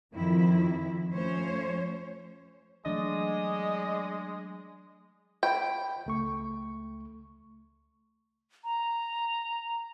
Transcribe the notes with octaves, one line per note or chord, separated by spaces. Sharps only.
F2 D#3 F3 E4
F3 A3 C#4 C5 C#5
E3 F#3 G#3 A3 D4 D5 D#5
G5 B5
C#2 A3 C#6
A#5